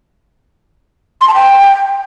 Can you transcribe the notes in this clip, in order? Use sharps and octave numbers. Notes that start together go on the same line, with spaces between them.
C6
A5
G5